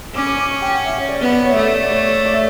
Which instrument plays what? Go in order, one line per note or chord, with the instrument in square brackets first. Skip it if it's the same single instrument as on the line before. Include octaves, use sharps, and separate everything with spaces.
[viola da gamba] C#4 [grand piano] D6
[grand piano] D6
D6
C#6
G5
F#5
E5
C#5
D5
[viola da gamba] B3 [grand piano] C#5
[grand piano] D5
C#5
E5
[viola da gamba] A3 [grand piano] D5
[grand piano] D5
C#5
D5
E5